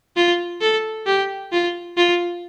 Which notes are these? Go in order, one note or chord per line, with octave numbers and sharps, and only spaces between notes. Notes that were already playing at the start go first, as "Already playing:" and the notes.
F4
A4
G4
F4
F4